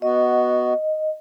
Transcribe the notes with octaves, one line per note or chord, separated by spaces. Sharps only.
B3 F#4 D#5